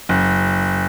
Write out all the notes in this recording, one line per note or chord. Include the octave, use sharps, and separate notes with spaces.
F#1